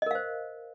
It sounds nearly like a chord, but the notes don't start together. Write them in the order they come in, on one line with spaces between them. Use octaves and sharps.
D#5 A#4 F5 C5